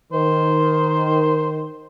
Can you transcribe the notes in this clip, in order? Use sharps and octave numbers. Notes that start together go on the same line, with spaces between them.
D#3 C5